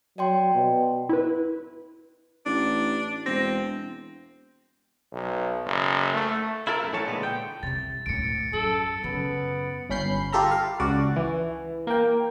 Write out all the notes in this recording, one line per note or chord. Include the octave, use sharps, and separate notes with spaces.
F#3 D5 G5 C6
B2
E4 B4
A1 D4
E1 C4 A#6
B1
F#1
A3
E4 F4 A4 A#4
F#2 A3
A2 D3 E3 A4 C#5 A5
A#2 D3 G#3 B3
G5
C2 C3 A6
D2 A2 C#7 D7
F#2 A4
F#2 C#3 B3
G1 C#4 B5 G6 C7
F4 G4 A4 E5 A#5
F5
C#2 F#4 D5
E3
A#3 G5